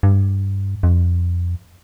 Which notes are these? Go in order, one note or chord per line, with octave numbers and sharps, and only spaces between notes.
G2
F2